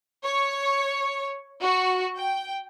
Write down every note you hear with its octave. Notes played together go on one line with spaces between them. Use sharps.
C#5
F#4
G5